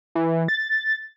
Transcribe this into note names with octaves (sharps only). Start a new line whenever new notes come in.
E3
A6